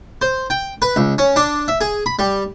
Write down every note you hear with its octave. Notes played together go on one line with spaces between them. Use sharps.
C5
G5
B4
C#2
C#4
D4
E5
G#4
B5
G3